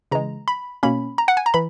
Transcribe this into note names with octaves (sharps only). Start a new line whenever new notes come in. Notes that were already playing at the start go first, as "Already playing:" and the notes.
C#3 E3 G#3 A#5
B5
B2 A#3 C#4 B5
A#5
F#5
G#5
A#5
E3 B5